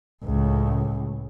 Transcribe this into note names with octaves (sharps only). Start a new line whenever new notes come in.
C#2 A2